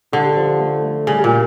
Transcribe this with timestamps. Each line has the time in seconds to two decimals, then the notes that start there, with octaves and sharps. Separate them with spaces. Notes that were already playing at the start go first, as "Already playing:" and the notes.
0.12 D3 G4
0.37 F3
0.60 A3
0.84 A3
1.07 C#3 G3
1.24 A#2